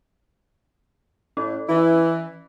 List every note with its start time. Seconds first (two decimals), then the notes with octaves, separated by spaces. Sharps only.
1.37 A2 C#4
1.69 E3 E4